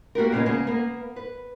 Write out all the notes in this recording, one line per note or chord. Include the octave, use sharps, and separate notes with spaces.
A#3 F#4 G4 A#4
A#2 C#3 G#3 B3
C#3 A#3 B3 G#5
A#3 B3
B4